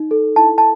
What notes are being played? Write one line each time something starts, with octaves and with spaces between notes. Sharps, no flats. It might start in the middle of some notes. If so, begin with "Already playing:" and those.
Already playing: D#4
A4
E4 A5
A5